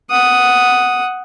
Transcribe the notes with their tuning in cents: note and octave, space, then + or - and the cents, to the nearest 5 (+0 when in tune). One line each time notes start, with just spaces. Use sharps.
F#5 +0 D#6 +0